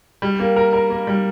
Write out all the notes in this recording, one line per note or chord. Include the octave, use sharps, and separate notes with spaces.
G3
A#3
A#4
A#4
A#3
G3